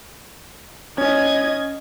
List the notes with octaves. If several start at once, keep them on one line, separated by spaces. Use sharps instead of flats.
C#4 D#5 G#6